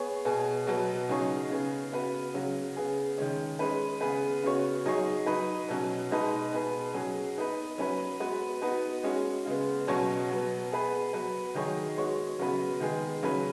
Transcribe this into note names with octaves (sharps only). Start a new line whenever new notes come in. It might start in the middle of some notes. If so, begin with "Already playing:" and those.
Already playing: B3 G#4 C#5
B2 B3 G#4
B2 F#3 B3
C#3 F#3 D#4 G#4 C#5
C#3 B3 G#4
C#3 B3 F#4 B4
C#3 F#3 C#4
C#3 B3 G#4
D#3 G#3 C#4
G#3 C#4 B4
C#3 B3 G#4 B4
C#3 B3 F#4 C#5
F#3 D#4 G#4 C#5
F#3 D#4 B4
B2 F#3 C#4
B2 G#3 D#4 B4
B2 B3 G#4 B4
F#3 C#4 G#4
B3 D#4 B4
F#3 C#4 B4
G#3 B3 F#4 B4
B3 D#4 F#4 B4
G#3 C#4 F#4
C#3 G#3 B3
B2 F#3 C#4 F#4 C#5
B2 F#3 B3
B3 G#4 B4
F#3 B3 F#4 B4
D#3 F#3 D#4 G#4 C#5
G#3 B3 F#4 C#5
C#3 F#3 B3 F#4 B4
D#3 G#3 B3 G#4
C#3 F#3 C#4 B4